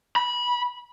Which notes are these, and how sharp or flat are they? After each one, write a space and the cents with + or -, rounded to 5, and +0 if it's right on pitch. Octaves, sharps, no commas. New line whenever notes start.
B5 -20